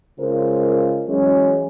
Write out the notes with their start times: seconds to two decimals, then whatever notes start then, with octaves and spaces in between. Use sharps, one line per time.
0.19 C#3 G#3 F4 A#4 C5
1.08 E3 F#3 G#3 C#4